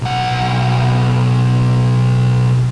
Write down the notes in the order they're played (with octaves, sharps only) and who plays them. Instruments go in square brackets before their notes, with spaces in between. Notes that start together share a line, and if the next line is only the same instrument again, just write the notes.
[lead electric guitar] B1 F#5